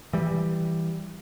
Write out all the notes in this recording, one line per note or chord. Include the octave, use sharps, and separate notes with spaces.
E3 G3